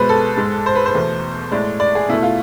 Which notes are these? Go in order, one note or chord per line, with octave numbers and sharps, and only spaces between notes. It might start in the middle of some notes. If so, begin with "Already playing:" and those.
Already playing: B2 G#3 B4 C5
A4
G#2 G#3
C5
B4
C5
E2 B2 A3
A2 G#3 D5
D5
G#4
B2 A3 E4
F4